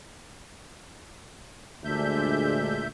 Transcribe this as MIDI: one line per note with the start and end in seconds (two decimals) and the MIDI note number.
1.84 2.90 38
1.84 2.87 46
1.84 2.84 56
1.84 2.84 62
1.84 2.87 76
1.84 2.87 91